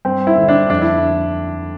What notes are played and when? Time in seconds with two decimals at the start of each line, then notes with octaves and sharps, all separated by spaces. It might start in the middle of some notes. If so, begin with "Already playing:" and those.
0.05 G2 C4
0.27 E4
0.37 D3
0.48 D4
0.70 F2 D4
0.82 E4